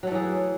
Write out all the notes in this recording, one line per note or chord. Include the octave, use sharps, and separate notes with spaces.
E3 F#3 A3 G#4